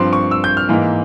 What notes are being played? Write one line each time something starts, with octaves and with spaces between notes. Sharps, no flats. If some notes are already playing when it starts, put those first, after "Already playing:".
Already playing: G2 F3 C4 C6
C#6
E6
G6
F6
G#2 E3 A#3